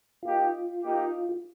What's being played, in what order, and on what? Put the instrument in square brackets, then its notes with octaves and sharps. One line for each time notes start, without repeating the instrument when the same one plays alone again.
[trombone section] A#3 D#4 G4 [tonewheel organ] F4
[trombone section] A#3 D#4 G4